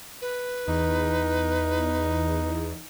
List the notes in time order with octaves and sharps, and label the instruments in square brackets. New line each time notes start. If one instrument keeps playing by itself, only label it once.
[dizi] B4
[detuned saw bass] E2 [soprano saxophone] D#4